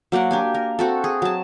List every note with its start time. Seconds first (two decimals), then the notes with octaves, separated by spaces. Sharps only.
0.12 F#3 A#3 D5 F#5
0.31 D4 G4 G#5
0.54 A#4
0.79 C4 F#4 A4
1.04 G#4
1.22 F#3 A5